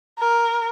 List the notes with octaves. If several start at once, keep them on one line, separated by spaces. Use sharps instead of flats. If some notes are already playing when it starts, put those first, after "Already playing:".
A#4